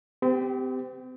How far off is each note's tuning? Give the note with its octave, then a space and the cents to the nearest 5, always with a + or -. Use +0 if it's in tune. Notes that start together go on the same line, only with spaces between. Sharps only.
C4 -40 G4 +5